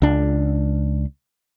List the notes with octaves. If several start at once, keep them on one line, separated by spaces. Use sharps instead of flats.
C#2 D4